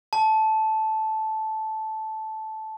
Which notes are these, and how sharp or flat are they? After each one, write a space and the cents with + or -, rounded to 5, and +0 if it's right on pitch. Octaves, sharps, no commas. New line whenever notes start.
A5 -10